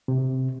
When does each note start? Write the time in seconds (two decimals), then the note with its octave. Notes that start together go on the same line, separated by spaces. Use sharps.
0.08 C3